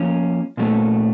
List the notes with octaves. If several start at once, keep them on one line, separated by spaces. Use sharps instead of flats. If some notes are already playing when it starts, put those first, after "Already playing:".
Already playing: F3 A#3 C#4
A#2 F#3 A3 C#4